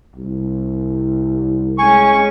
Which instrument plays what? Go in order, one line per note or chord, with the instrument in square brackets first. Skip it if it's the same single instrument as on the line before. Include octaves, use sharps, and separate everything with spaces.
[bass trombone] C2
[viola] G#3 C#4 [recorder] G#5 [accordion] C#6